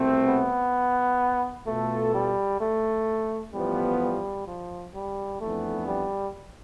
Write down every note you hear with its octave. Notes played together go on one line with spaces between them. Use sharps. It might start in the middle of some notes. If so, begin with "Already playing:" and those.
Already playing: C2 B2 A3 C4
B3
B2 A3 B3 F4 A4
G3
A3
A1 A2 F3 G3 B3
G3
F3
G3
F2 E3 A3 B3 D4
G3